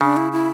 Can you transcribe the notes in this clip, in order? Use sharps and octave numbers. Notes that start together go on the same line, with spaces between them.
C#3 D4
E4
E4